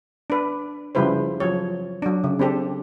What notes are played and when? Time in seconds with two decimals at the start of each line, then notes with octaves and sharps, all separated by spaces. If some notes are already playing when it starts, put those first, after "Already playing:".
0.30 D4 B4
0.95 C#3 F3 G3 E4 B4 C5
1.40 F3 F#3 C#5
2.02 F#3 D4
2.24 C#3
2.39 C4 D4 G4 A4